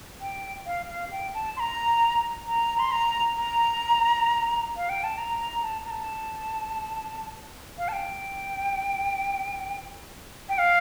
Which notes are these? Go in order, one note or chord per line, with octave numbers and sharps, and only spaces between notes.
G5
F5
F5
G5
A5
C6
A#5
A#5
C6
A#5
A#5
F5
G5
A5
A#5
A#5
A5
A#5
A5
F5
A5
G5
G5
F5